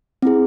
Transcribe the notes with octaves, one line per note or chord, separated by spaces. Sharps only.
C4 E4 G#4